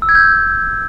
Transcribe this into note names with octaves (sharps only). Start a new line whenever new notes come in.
E6
G#6
G6